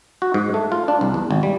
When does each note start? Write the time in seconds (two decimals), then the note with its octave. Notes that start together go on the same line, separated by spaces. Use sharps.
0.22 F#4
0.34 G#2
0.54 A3
0.72 F4
0.88 D4
1.01 C2
1.14 E2
1.31 G#1
1.43 G3